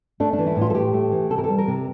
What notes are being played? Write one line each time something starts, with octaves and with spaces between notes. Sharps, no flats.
A3 D4
D4
E3
E4
A2
F4
A4
A2 G4
A3
E3
C3 A4
A#4
A4
G3
A#4
C3